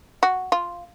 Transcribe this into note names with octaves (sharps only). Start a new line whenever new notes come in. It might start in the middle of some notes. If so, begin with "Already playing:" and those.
F#4
F4